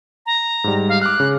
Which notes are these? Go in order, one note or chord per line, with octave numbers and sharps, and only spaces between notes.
A#5
G#2 G3
F5
D6 F6 F#6
C#3